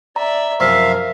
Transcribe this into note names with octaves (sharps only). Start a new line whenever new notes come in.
D5 E5 A#5
F#2 C3 F3 A#4 E5 F5